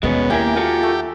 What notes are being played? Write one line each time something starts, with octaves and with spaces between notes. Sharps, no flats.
D#2 B2 D#3 G#3 B3 C#4
A#3 E4 G4 A#4 E5 G#5 D6
F4 F#4 A4 A#5
A3